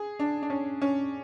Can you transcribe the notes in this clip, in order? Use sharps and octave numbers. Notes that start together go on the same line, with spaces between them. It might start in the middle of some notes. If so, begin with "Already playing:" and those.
Already playing: G#4
D4
D4
C#4
C#4